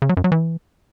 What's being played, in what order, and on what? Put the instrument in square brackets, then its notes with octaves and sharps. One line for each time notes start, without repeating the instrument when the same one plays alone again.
[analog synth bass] C#3
F#3
F#2
F#3
E3